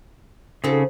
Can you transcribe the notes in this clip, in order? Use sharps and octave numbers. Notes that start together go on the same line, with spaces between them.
C#3 C4 D#4 F#4 A4 C5